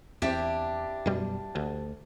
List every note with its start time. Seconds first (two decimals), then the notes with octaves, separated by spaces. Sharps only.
0.22 E2 C4 D4 E4 G4
1.06 F#2 B2 G3
1.55 D2